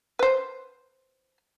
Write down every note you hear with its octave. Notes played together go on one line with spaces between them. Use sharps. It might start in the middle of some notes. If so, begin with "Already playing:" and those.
B4 C5